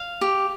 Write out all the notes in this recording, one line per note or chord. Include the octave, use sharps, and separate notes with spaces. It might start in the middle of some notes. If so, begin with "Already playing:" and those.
Already playing: F5
G4